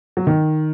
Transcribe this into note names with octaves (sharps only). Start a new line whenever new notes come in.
F#3
D#3